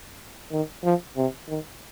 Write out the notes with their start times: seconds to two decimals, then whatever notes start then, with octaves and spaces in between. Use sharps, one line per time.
0.51 D#3
0.84 F3
1.17 C3
1.48 D#3